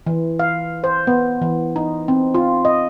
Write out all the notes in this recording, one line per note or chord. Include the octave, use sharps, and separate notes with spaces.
E3
F5
C5
B3
E3
D#4
C4
F4
D#5